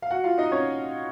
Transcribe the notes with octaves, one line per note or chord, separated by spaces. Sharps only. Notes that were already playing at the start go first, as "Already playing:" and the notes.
F5
F#4 F#5
F4 F5
D#4 D#5
C#4 C#5